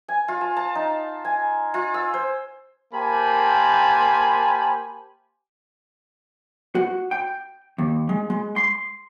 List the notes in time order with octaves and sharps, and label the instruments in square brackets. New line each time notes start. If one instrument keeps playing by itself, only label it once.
[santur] G#5
F4
A5
A5
D#4
G#5
F4
E6
C5
[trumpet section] A#3 G4 C5 G#5 A5 B5
[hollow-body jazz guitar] F#4
G5
D#2
G#3
G#3
C6